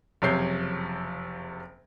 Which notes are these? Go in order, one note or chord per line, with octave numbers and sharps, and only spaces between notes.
F#1 F2 C3 C#5 G6 C7